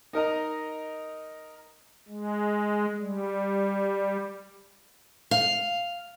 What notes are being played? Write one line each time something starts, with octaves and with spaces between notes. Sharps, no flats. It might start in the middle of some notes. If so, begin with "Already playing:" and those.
D#4 A#4 D#5 A#5
G#3
G3
F5